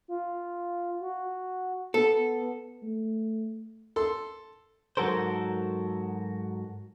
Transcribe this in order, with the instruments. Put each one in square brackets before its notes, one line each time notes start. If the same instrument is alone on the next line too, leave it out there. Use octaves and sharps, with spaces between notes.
[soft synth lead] F4
F#4
[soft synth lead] B3 [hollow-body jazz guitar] A4
[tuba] A3
[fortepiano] A4 C6
[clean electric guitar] G#2 F#3 F#4 A4 A#4 C5